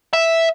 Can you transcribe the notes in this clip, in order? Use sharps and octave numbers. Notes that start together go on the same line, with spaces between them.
E5